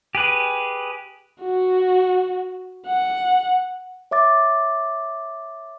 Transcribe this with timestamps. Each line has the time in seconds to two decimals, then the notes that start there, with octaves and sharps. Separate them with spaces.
0.15 G4 G#4 B4
1.42 F#4
2.87 F#5
4.11 C#5 E5 D6 A6